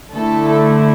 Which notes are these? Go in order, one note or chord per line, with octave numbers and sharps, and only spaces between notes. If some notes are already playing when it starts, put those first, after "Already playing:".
D3 A3 E4 A4